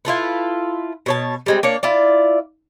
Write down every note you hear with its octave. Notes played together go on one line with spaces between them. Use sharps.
E4 F4 A4 B4
B2 C#5 A5
G3 G#3 C4
A#3 D4 C#5
E4 F4 D5